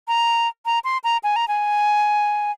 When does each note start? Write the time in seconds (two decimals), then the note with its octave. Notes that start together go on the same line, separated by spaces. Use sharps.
0.08 A#5
0.66 A#5
0.84 C6
1.04 A#5
1.23 G#5
1.36 A#5
1.48 G#5